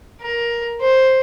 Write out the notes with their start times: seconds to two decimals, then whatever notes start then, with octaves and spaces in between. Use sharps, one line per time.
0.21 A#4
0.81 C5